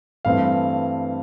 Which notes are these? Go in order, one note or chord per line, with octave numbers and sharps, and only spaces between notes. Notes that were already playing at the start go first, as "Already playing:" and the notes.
G2 E3 A3 C4 F5